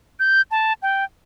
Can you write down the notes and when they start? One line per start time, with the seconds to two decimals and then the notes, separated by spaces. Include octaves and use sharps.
0.20 G6
0.51 A5
0.82 G5